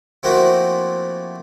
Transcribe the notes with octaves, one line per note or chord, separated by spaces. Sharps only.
F3 A3 A#3 C4 E4 F#4